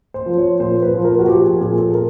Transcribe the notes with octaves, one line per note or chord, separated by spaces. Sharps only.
C5
F3
C#5
A#2 C5
B4
F3
A#4
F#4
F3 G4
G#4
A#2 G#4
A4
A#4